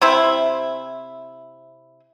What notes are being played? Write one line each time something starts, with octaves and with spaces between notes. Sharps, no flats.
C3 C4 E4